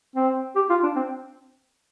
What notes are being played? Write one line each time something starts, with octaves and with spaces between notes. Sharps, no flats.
C4
G4
F4
D4
C4